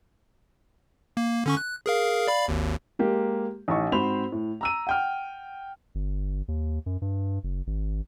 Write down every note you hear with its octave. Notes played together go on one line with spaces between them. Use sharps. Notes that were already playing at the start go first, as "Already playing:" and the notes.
A#3
D3 C#4 C#6
F#6
G#4 A#4 F5
D5 F5 B5
G#1 D#2
G#3 A#3 G4
A1 A2 D#4 C#6
G#2 C4 F#4 C5 B5 F7
A2
A#5 E6 D#7
F#5 G5 F6
G1
D#2
F#2
G2
F#1
G#1